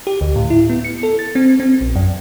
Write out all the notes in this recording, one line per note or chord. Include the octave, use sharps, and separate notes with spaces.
G4
D2
A2
E4
B3
C#7
A4
A6
C4
C4
A#1
F#2